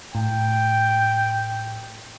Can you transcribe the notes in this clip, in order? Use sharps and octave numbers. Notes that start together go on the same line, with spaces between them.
A2 G5